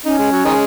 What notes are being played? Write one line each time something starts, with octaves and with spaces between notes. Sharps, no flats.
C#4 D#4
G#3
F#3
D#3 G#3